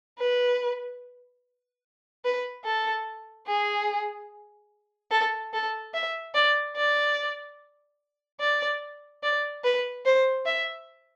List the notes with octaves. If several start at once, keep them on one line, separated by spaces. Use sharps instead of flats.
B4
B4
A4
G#4
A4
A4
E5
D5
D5
D5
D5
B4
C5
E5